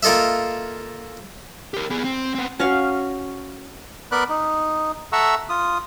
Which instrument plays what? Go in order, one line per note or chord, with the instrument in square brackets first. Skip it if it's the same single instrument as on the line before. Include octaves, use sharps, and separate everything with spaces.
[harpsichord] A#3 F4 A4 D#5 E5
[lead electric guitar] G4 A#4
B3 G#4
C4
B3 C4
[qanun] C#4 F#4 F5 C#6
[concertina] B3 A#4 D5 B5 F#6
D#4
A4 E5 F#5 A#5 C#6 E6
F4 D#6